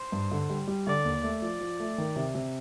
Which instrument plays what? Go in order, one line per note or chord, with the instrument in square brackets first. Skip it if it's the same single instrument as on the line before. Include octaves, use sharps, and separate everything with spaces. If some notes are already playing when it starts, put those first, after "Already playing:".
Already playing: [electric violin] C5
[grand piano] G2
D3
G3
G3
[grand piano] D3 [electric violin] D5
[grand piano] D#2
A3
[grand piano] F3 [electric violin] D5
[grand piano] F3
A3
D#3
C3
C3